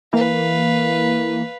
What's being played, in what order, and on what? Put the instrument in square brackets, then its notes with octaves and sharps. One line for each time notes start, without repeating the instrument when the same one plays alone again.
[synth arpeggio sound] E3 A#3 [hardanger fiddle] B4 F5